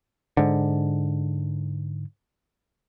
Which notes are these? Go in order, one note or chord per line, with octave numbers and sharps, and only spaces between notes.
G#2 D3